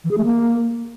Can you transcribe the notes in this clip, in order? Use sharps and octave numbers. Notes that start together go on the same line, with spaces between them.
E3
G#4
A3
A#3